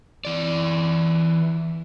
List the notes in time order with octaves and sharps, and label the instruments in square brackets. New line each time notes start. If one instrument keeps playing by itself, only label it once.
[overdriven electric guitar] E3 D5